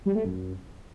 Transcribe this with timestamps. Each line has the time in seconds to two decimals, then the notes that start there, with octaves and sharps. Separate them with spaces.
0.06 G3
0.15 A3
0.25 F#2